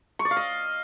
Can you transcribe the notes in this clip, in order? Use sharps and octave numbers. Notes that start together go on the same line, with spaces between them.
C#6
D5
F5
D#5